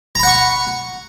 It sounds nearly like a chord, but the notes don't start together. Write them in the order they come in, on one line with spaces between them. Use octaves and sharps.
A#5 B5 F#5 C#6